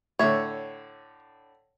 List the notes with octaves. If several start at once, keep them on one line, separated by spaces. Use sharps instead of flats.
A2 D3 C#5 E5